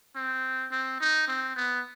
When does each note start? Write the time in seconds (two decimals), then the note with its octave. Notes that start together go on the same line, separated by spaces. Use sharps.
0.16 C4
0.71 C4
1.00 D#4
1.28 C4
1.56 B3